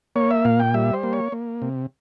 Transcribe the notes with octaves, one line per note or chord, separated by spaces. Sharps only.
A#3 C#5
E5
A#2 F5
G5
G3 E5
C5
A#3
C#5
A#3
C3